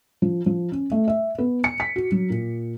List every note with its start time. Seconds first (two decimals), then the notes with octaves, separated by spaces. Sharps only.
0.22 F3
0.46 F3
0.72 C#4
0.92 A3
1.08 E5
1.38 B3
1.64 C#7
1.80 B6
1.96 F#4
2.12 F#3
2.30 A#2